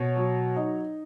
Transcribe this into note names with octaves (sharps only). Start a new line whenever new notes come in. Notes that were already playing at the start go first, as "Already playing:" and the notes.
Already playing: B2 C#5
F#3
D#4